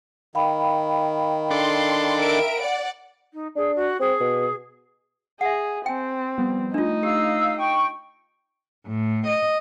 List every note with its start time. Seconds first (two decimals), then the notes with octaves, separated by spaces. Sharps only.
0.35 D#3 F5 G5 B5
1.51 D4 A4 C6
2.18 A#4 E5 D7
2.60 D5 F#5
3.33 D#4
3.56 D4 G#4
3.75 F#4
4.00 C4 G#4
4.21 B2
5.41 G#4 E5 F#5
5.86 C4 G5 G#5
6.38 F3 G3 B3
6.74 A3 D4 D#4 F4
7.03 G4 F5 E6
7.58 G5 C#6
8.87 A2
9.26 D#5